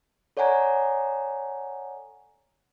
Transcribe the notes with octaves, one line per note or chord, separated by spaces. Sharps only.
A4 C#5 D5 F#5 G#5 A#5